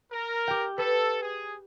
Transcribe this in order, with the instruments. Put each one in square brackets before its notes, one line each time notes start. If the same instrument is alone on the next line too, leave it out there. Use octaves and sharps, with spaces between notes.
[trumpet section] A#4
[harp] G4 G5
[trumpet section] A4 [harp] B4
[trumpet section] G#4